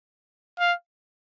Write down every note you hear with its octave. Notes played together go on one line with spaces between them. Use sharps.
F5